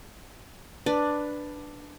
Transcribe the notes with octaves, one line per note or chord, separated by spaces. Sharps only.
D4 B4